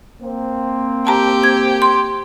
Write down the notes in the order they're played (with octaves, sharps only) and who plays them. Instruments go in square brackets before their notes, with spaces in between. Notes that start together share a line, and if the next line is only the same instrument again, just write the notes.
[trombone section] A#3 C4
[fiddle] G4 [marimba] A5 A#5
[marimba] G#6
C6